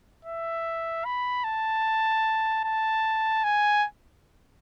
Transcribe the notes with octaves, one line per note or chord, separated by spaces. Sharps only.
E5
B5
A5
A5
G#5